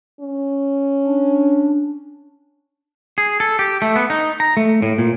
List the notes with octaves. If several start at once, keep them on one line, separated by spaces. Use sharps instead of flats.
C#4
D4
G#4
A4
G4
A3
B3
D#4
A#5
A3
A2
A#2